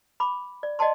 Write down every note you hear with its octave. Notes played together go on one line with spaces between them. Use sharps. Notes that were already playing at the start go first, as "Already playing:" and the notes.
B5 D6
D5
D5 D#5 F#5 G5 A5 C6